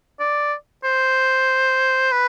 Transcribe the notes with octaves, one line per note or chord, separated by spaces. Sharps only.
D5
C5
B4